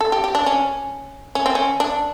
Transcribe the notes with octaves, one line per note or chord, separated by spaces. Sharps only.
A4
G4
G4
D4
C#4
C#4
C4
C#4
D4